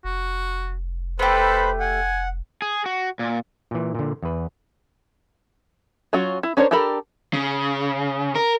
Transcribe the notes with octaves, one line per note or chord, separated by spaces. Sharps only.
F1 F#4
A3 G4 A4 B4 C5 B5
F#5 G#5
G#4
F#4
A#2
A#2 E3
A#2 D3
E2 B4
F#3 C#4 F4 F#4
E4
C#4 D4 A#4 C5 C#5
D4 G4 A4 A#4 B5
C#3
A#4